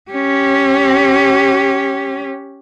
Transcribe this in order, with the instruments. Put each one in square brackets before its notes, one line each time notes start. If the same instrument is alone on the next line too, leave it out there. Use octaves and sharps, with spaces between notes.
[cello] C#4 G4